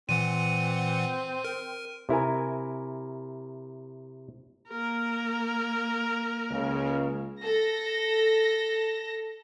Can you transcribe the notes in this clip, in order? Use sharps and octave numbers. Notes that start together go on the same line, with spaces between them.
A#2 E3 C4 F#5 D#7
A#4
C3 E4 A#4 G#5
A#3 A#4
C#2 C#3
A4 A#6